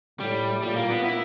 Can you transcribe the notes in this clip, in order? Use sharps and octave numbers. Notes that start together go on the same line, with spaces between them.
A2 G3
A#2 G3
A#3
B3
E4